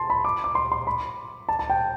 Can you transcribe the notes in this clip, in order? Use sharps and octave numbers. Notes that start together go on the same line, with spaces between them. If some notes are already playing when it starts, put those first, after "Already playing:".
Already playing: A5 C6
B5
D6
D6
C6
C6
B5
A5
A5
G5